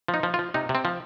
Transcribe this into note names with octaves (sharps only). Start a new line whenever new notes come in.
F3
D#4
F3
F4
F3
C3 D#4
C3
C4
F3